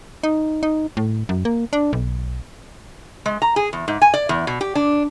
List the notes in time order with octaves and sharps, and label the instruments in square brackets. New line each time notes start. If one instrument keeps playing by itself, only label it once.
[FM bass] D#4
D#4
A2
F#2
A#3
D4
B1
[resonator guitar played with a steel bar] G#3
A#5
G#4
E2
G#2
G#5
D5
E2
B2
G4
D4